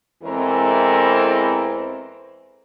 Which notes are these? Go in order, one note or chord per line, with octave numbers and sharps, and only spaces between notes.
E2 E3 G#3 C4 A4 A#4